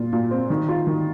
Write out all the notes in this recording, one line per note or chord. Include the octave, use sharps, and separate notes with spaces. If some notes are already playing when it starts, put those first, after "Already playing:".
Already playing: A#2 F4
A#2
C4
D#3
F4
D#3